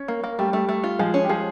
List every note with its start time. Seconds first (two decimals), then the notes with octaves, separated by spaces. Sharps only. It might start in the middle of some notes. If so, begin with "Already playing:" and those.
Already playing: C#4 C#5
0.08 A#3
0.24 A#3
0.38 G3 A3 G4
0.53 A3
0.69 A3
0.84 F4
0.99 F3 G#3 G#4
1.14 C#4
1.24 G4
1.29 F3 G#3 G#4